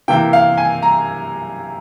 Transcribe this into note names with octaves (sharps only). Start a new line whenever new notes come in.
C3 E3 A#3 E4 G5
F5
G#5
A#5